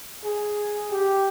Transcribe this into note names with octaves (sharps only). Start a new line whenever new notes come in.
G#4
G4